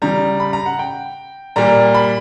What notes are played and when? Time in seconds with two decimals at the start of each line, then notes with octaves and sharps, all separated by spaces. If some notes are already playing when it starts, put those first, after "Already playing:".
0.02 C#3 G3 A#5
0.40 B5
0.53 A#5
0.66 F#5
0.79 G5
1.56 A#2 G3 A#5
1.95 B5